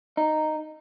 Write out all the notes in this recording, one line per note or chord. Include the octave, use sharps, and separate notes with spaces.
D#4